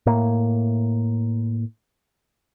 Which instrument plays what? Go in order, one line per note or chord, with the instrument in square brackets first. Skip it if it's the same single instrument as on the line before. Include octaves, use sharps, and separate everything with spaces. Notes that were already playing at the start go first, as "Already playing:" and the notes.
[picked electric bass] A2 A#3